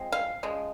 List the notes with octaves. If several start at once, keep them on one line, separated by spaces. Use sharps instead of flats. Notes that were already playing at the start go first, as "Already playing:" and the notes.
Already playing: F3 G#3 C4
F5
C#3 F3 G#3